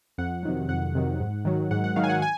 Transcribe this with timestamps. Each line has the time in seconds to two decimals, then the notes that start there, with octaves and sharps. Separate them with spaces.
0.18 F2 F#5
0.43 C3 D#3 F#3
0.69 F2 F#5
0.95 C3 D#3 F#3
1.20 G#2
1.45 D#3 F#3
1.71 G#2 F#5
1.84 F#5
1.96 D#3 F#3 F5
2.04 G#5
2.09 F#5
2.22 G#5